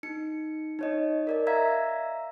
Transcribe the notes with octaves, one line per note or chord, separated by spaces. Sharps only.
D#4 C#7
D#4 C#5 D#5
A#4 D5 D#5
E5 F5 A#5 E6 G#6 B6